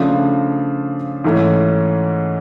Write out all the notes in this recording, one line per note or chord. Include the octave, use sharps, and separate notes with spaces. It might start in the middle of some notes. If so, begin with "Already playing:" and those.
Already playing: C#3 F3 A3 D4 F4
G#2 E3 A3 C#4